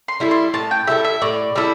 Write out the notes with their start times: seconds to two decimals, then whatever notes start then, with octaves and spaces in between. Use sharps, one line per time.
0.08 C6
0.20 G3 E4 A4
0.31 C6
0.54 A2 A5
0.71 G5
0.87 G3 E4 A4 E5
1.04 E5
1.21 A2 D5
1.56 G3 E4 A4